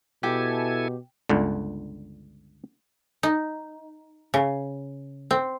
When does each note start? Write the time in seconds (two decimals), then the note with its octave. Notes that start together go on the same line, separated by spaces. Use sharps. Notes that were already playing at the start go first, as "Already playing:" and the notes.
0.23 B2 E4 G4 A4 G#5
1.29 G1 C#2 D3
3.23 D#4
4.34 C#3
5.31 C4